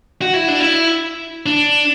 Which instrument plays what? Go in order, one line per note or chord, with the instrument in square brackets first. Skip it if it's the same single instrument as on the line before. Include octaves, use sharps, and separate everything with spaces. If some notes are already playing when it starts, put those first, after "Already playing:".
[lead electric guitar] F#4
E4
D4
E4
D4